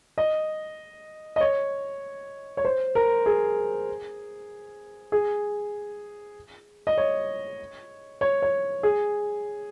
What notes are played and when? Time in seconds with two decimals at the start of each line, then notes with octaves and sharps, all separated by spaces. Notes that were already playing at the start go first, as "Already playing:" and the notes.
0.18 D#5
1.36 D#5
1.41 C#5
2.57 C#5
2.65 C5
2.95 A#4
3.26 G#4
5.12 G#4
6.87 D#5
6.97 C#5
8.21 C#5
8.42 C#5
8.83 G#4